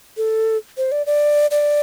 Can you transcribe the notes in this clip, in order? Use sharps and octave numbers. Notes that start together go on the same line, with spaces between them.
A4
C5
D5
D5
D5